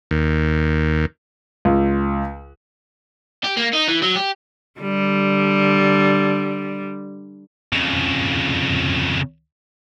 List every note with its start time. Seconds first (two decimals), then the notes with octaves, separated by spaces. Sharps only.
0.11 D#2
1.65 C#2
3.44 G4
3.57 A#3
3.73 D#4
3.88 E3
4.02 F#3
4.16 G4
4.81 D3 G3
7.73 F2 C#3